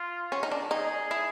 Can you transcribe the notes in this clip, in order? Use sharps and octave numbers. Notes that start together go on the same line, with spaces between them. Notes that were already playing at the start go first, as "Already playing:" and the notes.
Already playing: F4
C#4
D#4
D4
D#4 G#4
E4